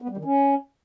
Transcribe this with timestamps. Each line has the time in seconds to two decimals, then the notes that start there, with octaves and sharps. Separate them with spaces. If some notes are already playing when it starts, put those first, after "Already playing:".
0.02 B3
0.09 G3
0.17 D#3
0.25 C#4